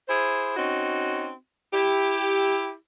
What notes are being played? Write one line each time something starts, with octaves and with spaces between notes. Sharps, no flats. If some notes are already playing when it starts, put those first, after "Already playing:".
E4 G#4 C5
C4 C#4 D#4 F#4
E4 G4